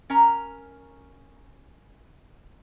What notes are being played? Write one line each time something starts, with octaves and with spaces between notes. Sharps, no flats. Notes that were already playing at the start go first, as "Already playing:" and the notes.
C#4 A#4 A#5